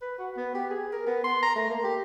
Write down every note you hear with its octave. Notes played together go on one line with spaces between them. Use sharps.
B4
F#4
B3
G4
G#4
A#4
B3
C6
A#5
A3
A#3
G4